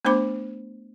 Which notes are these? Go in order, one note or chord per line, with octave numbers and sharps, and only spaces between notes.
A3 B3 D4 C5 B5 D6